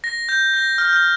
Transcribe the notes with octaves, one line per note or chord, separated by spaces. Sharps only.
A#6
G6
A#6
F6
G6
F6